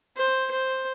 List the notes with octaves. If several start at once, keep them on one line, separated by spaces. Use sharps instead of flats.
C5
C5